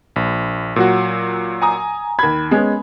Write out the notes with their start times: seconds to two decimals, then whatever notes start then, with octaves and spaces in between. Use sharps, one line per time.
0.16 A#1
0.76 A#2 F#3 F#4
1.62 G#5 A#5 D#6
2.19 D#2 B5 G#6
2.51 G#3 B3 C#4